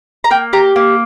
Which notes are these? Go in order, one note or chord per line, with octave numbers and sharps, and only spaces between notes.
A#5
A#3 G5
G4 A#5
A#3